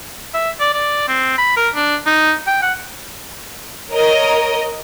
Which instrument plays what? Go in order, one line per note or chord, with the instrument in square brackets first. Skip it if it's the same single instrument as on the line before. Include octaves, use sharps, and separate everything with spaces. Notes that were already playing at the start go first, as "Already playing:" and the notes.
[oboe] E5
D5
D5
C4
B5
A#4
D4
D#4
G5
F#5
[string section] A#4 C#5 D#5